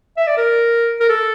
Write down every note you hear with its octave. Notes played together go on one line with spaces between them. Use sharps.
E5
D5
A#4
A#4
A4